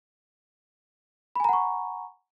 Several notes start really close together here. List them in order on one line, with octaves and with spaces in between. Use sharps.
B5 G#5 A#5 F#5 C#6